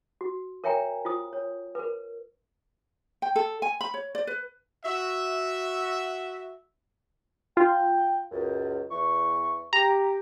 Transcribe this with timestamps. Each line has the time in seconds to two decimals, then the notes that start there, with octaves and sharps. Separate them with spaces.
0.21 F#4
0.64 A#4 C#5 E5 G5 G#5 A#5
1.05 F4 C5 D#6
1.33 C#5
1.75 A#4 B4
3.22 G5
3.36 A4
3.62 G#5
3.81 B5
3.94 C#5
4.15 D5
4.27 B4
4.84 F#4 E5
7.57 F4 G5
8.31 C#2 F#2
8.90 E2 E3 C#6
9.73 G4 A#5